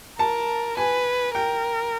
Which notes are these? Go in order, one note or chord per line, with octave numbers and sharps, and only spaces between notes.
A#4 A5
B4 G#5
A#4 G5